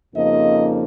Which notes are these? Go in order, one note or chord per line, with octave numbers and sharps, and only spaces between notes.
F2 C#3 F3 A#3 D#4 D#5